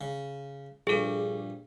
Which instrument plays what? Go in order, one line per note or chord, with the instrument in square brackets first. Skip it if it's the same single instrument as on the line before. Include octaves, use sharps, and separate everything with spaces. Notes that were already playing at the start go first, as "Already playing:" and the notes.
[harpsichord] C#3
[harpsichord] A#1 G2 [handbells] G#4 A4